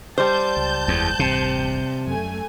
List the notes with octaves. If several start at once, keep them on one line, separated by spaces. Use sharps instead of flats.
G3 C5 A5 G6
C#2
F#1 E2 G#3
D1 A1 G2 C3
F#2 A3 G#5